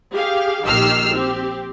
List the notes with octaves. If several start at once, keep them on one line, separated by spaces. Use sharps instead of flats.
G4 G#4 F5
A#1 D#3 G4 E6 F6 C7
C4 G4